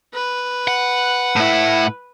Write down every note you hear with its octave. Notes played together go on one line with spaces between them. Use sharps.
B4
F#5
A2 E4